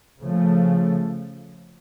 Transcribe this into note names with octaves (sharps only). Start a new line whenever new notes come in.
C#3 F3 A3